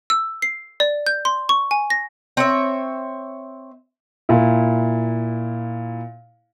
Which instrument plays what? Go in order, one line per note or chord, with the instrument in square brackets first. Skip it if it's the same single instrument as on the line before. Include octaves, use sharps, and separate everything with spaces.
[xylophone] E6
C7
D5
G6
C6
C#6
G#5
A#6
[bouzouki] C4 C#5 E5
[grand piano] A#2 E4